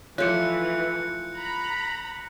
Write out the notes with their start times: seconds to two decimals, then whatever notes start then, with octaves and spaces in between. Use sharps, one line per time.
0.18 E3 F3 A3 F4 C#5 F#6 G6 C#7
1.34 A#5 B5